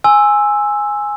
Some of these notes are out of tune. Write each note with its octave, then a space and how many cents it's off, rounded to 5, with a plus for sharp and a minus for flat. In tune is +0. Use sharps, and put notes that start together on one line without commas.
G#5 +0 C6 +15 E6 +0